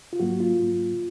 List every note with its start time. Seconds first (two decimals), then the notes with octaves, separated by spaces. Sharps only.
0.13 F4
0.20 G#2 F#3 A#3 F#4
0.40 F4
0.60 G#2 F#3 A#3 F4